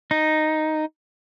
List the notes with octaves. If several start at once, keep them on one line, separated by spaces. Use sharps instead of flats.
D#4